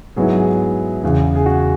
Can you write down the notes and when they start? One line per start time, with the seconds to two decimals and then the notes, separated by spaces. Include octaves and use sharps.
0.16 G#2 F#3 B3 E4 G#4
0.38 G#4
1.03 E2 C#3 E3
1.35 G#4
1.46 F#4